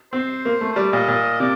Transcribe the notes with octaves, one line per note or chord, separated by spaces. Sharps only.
C4 C5
A#3
A3
C5
G3 D5
A#2 D#5
A#2
C3 D5